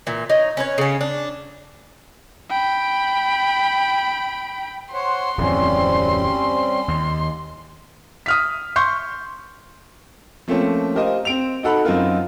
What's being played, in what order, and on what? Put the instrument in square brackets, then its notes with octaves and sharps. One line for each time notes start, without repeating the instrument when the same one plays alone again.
[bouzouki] A#2 E3
D#4 C#5
C#4 B4 C#5
C#3 C#4
D4
[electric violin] G5 B5
[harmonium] C5 C#5 F#5 [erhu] C6
[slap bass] D1 F2 E3 [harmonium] G3 C4 C#4
[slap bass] D#2
[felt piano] D#6 F6 B6
C6 C#6 G6
[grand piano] F3 A3 A#3 C4 C#4
G4 A#4 C5 D#5 F5
C4 D7 F7
D#4 F#4 A4 F#5 B5
F#2 C4 D#4 F4 A#4